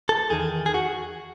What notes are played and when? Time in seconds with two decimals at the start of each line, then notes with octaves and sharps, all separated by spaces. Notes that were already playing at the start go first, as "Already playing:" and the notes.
0.09 A4
0.30 E2 D#3 G#4
0.66 G#4
0.74 F#4